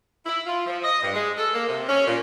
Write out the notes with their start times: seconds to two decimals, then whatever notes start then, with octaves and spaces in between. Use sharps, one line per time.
0.26 E4
0.47 F4
0.67 F3
0.84 D#5
1.02 G2
1.14 G#3
1.38 A4
1.54 A#3
1.68 C3
1.89 C#4
2.07 A#2